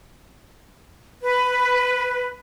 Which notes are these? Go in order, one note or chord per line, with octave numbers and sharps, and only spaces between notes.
B4